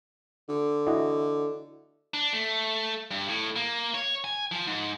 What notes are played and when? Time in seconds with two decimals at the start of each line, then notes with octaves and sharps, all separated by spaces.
0.49 D3
0.87 E4 F#4 D#5
2.14 D4
2.33 A3
3.11 G2
3.29 A2
3.56 A#3
3.94 C#5
4.24 G#5
4.52 F3
4.67 G#2